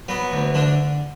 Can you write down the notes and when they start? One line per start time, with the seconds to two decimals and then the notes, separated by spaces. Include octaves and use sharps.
0.08 F#3 B3
0.32 D2
0.54 D3 D4